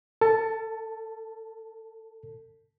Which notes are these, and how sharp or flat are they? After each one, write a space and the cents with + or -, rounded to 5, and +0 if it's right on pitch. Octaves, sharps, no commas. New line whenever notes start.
A4 +35 A5 -5